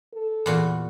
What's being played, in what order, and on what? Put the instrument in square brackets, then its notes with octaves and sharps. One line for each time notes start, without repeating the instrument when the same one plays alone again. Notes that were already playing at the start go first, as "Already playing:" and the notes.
[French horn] A4
[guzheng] E2 A#2 F#4